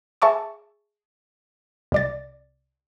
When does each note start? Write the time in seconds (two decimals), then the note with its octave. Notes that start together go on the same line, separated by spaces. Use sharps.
0.22 G#4 E5 A5 C#6 D6
1.92 C2 D5 A6